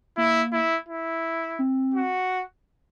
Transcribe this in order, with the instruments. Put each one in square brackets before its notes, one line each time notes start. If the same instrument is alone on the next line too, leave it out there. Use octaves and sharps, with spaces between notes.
[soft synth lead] A#3 [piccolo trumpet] E4
[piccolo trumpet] E4
E4
[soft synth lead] C4
[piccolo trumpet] F#4